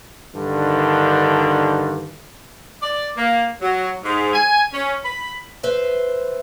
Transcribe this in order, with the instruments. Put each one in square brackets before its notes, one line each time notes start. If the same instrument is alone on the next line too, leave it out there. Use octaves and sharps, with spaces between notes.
[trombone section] G2 D3 D#3
[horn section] D5
A#3
F#3
G#2
G#5
C#4
B5
[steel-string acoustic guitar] B4 C5 E5